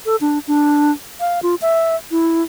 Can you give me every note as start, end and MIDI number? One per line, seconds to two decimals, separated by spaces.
0.06 0.16 69
0.21 0.39 62
0.48 0.91 62
1.20 1.40 77
1.43 1.55 65
1.62 1.96 76
2.11 2.43 64